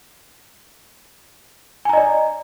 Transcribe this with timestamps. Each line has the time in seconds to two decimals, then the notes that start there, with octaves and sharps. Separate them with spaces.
1.85 G#5
1.89 A#5
1.93 D#5
1.97 D5